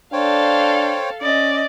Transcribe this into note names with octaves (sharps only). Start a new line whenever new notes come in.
D4 A4 C5 C#5 F5 G5
C#4 D5 D#5